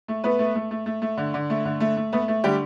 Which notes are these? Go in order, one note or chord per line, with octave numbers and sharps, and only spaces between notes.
A3
A3 B3 B4
A3
A3
A3
A3
A3
D3
D3
A3
D3
A3
A3
A3 B3 B4
A3
D3 G3 G4